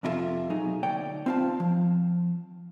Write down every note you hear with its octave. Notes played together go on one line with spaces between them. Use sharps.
F2 C3 E4 F4 A4 E5
B1 F#3 D#4 G#4
D2 A#3 C#5 D5 G5
C4 E4 F4 F5 A5
F3